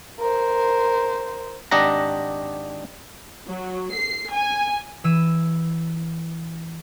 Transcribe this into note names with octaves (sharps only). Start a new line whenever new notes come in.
A#4 C5
G#1 D4 G4 D#5 F#5 A#5
F#3
C7
G#5
E3 E6 D#7